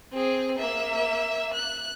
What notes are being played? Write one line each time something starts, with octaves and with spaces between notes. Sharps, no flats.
C4 G#4
A#3 E5
F#6